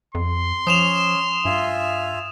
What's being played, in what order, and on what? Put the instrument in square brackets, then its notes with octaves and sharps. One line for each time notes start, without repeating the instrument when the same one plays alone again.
[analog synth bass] F2 [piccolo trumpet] C6
[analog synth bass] F3 [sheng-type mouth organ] C#4 [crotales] D#6 E7 F7
[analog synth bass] G2 [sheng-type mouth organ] F4 E5 G#5